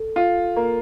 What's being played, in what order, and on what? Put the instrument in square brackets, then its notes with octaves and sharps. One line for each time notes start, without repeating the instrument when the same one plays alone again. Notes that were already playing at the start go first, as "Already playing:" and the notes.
Already playing: [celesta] A4
[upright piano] F4
A#3